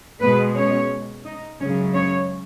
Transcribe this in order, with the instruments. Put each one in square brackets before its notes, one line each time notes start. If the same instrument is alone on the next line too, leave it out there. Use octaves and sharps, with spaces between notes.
[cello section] B2 G#3 B3 B4
C#4 C#5
D#4 D#5
F#2 C#3 G#3 C#4 C#5
C#4 C#5